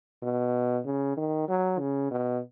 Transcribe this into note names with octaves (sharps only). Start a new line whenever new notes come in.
B2
C#3
D#3
F#3
C#3
B2